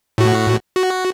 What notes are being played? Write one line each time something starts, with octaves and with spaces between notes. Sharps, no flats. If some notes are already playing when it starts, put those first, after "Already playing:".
A2 F#4
F#4